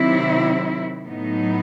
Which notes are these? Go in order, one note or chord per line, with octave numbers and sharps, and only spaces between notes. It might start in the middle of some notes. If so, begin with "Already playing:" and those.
Already playing: C3 D#3 F#3 C4 E4
A2 F#3 B3 D#4